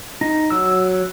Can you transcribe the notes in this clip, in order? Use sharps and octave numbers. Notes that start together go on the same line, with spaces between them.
D#4
F#3 E6